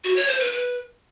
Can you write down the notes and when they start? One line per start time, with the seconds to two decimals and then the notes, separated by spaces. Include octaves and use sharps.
0.04 F#4
0.16 C#5
0.28 C5
0.40 B4
0.52 B4